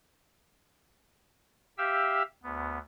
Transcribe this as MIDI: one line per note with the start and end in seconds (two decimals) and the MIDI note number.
1.78 2.22 67
1.78 2.22 76
1.78 2.22 77
1.78 2.22 79
1.78 2.22 88
2.43 2.78 38
2.43 2.78 59